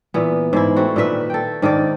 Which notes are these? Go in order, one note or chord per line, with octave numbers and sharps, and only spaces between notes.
A#2 E3 B3
G#2 G#3 E4
A3 C4 F#4
A#2 D#3 B4 E5
A4 G5
G#2 D#3 A4 D5